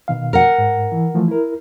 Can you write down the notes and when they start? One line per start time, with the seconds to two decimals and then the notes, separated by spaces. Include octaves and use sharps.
0.08 B2 D#3 F5
0.33 A#4 F#5
0.58 G#2
0.92 E3
1.15 E3 F3 A3
1.28 E4 A#4